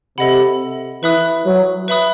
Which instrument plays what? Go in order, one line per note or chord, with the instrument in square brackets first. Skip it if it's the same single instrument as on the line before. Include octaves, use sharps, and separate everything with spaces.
[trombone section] C3 [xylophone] A4 D#5 F#5 B5
[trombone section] E3 [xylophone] B4 E5 B5 D#6 F#6
[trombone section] F#3
[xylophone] B4 E5 B5 D#6 F#6